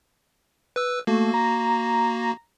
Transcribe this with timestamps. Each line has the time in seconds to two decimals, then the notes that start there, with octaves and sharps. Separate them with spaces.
0.76 B4 E6
1.07 A3 A#3 F#4
1.34 A#5